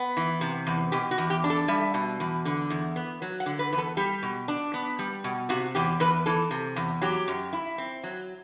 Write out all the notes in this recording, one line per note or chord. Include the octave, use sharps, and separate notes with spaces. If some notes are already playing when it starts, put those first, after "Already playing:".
Already playing: B3
E3
C3
E2
B2 G4
F#4
E2
G4
D4
A4
G3 E5
B2
E2
D3
E2
B3
F#3
F#5
D3
B4
E2 B4
A4
G3 G4
B2
D4
B3
G3
B2
C3 F#4
E2 G4
E2 B4
E3 A4
C3
E2
F#3 G4
F#2
E4
C4
F#3